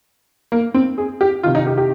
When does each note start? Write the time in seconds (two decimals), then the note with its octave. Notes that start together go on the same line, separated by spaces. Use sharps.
0.52 A#3
0.74 C4
0.98 G#4
1.21 G4
1.43 C3 D#3 F4
1.55 D#4
1.67 G4
1.78 G4